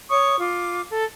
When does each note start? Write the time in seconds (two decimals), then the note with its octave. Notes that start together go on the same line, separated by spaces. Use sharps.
0.10 C#5 C#6 D#6
0.40 F4 D6
0.90 A4